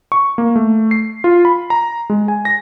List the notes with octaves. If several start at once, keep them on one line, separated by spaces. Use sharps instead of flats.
C#6
A#3
A3
C7
F4
B5
A#5
G#3
G#5
A#6